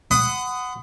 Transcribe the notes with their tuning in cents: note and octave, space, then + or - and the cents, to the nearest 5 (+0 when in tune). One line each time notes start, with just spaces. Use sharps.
F#5 +0 B5 +40 D#6 +0